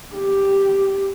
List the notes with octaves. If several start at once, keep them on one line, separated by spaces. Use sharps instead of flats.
G4